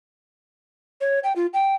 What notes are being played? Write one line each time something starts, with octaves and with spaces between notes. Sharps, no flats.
C#5
G5
F4
G5